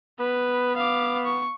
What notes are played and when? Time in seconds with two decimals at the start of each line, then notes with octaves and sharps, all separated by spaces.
0.20 B3 B4
0.77 F5 D6
1.25 C#6